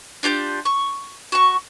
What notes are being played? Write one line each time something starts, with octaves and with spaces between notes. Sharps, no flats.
D4 F4 G4 G6
C#6
F#4 C#6